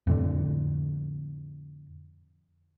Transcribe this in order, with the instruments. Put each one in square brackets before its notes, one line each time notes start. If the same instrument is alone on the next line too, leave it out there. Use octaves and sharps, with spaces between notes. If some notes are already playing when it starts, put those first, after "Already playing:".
[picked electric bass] F2 A2 D3